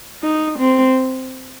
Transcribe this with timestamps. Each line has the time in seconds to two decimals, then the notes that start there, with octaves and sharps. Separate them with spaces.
0.23 D#4
0.59 C4